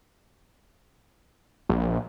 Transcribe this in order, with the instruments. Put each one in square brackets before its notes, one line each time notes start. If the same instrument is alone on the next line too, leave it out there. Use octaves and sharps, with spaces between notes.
[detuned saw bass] A#1